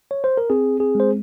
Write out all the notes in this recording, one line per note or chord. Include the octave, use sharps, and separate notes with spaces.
C#5
C5
A#4
C4 G#4
G#4
G#3 C5